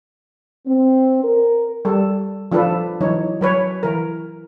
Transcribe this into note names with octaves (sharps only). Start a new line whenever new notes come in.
C4
A#4
G3 A4
F3 D4 F4 A4 B4
E3 F#3 D#4 C#5
F#3 B4 C#5
E3 A#4